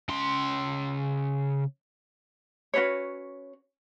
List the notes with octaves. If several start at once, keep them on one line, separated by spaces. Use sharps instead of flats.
C#3 C6
C#4 F#4 B4 C#5